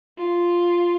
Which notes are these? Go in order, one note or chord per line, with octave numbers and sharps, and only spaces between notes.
F4